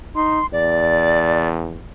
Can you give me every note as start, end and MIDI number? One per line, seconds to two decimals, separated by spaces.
0.15 0.40 63
0.15 0.46 84
0.53 1.79 40
0.53 1.48 74